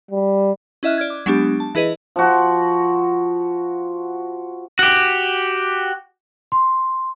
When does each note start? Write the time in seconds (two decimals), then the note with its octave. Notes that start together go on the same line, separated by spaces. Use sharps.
0.11 G3
0.83 C#4 E4 D#5 E5 F6 F#6
0.98 D5 F6 G#6
1.10 D6
1.26 F#3 G#3 B3 D4 G4
1.60 A5
1.75 E3 E4 G#4 B4 D#5
2.16 F3 F#4
4.79 F#4 G4
6.52 C6